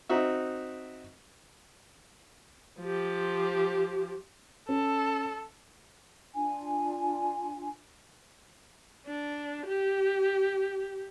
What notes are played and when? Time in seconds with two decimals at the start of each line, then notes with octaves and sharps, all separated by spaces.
0.09 C4 D#4 F#4 E5
2.80 F3 G4
4.69 C#4 A4
6.35 D4 F4 G#5
9.06 D4
9.66 G4